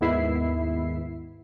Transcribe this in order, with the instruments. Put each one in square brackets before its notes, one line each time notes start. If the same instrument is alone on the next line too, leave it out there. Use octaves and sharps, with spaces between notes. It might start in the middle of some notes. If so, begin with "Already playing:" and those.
[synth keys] D#2 G#2 B3 E4 E5 C7